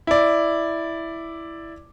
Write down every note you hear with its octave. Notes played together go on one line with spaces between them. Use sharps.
E4 D5